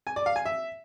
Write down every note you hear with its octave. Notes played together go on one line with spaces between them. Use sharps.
G#5
D5
F5
G#5
E5